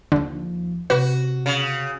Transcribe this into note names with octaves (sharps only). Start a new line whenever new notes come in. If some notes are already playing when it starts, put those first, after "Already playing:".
D#2 D3 F3
C3 F#4 B4
C#3